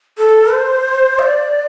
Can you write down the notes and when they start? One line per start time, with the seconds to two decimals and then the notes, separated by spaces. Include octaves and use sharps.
0.18 A4
0.52 C5
1.19 F5
1.22 D5